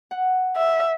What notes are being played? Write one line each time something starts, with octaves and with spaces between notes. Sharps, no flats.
F#5
E5